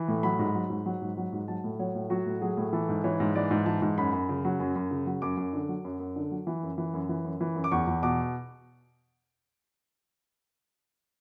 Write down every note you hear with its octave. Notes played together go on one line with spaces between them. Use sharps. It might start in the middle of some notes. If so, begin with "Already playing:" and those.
Already playing: E3
A2
F#3 B5
G#2
F#3
G#2
F#3
G#2
F#3
G#2
F#3 A5
A2
F#3 C#5
A2
F#3 F#4
A2
F#3 G#4
A2
E3 A4
G#2
E3 C#5
G#2
E3 D5
G#2
E3 A5
G#2
F#2 B5
F#2
C#3
F#3
F#2
F#2
C#3
F#3
F#2 D6
F#2
D3
F#3
F#2
F#2
D3
F#3
E3
F#2
E3
F#2
E3
F#2
E3
F#2
D6
E2 C#6
E2
B2 D6